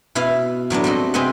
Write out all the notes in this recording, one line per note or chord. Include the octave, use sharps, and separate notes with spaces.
B2 E4 B4 F5
A2 F#3 B3 D4
G3 C4 F#4 D#5
C3 C4 G#4 B4 D#5 F#5